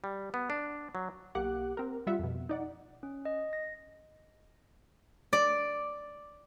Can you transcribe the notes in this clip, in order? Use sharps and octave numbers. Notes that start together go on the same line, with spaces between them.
G3
B3
D4
F#3
B1 A#3 G4 F#5 D6 F#6
C4 A#4
G3 F4 E5 F#5
F2 B2
D#4 D5 F#5
C#4
D#5
A#6
D5